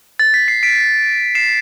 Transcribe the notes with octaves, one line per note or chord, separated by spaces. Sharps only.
A6
B6
C7
B6 D7
C7 E7